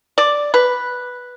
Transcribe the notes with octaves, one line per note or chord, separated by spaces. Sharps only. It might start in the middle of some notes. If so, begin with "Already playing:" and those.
D5
B4